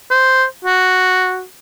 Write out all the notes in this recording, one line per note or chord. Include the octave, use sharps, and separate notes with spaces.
C5
F#4